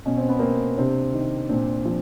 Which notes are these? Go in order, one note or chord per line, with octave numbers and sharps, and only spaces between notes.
B2 C#4
C4
B3
A#3 C4
C3 C4 D4
D#3
A#2 C4 D4
F3